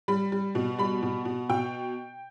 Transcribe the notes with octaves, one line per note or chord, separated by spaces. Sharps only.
G3 B5
G3
B2
G3 B5
B2
B2
B2 G5